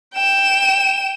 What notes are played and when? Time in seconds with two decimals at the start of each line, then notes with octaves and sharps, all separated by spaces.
0.15 G5 E7